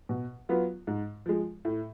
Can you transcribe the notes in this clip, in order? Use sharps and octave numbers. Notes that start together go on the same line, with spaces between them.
B2
F#3 B3 F4
G#2
F3 G#3
A2